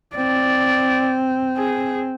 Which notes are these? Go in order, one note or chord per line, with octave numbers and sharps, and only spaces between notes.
C4 D5
G#4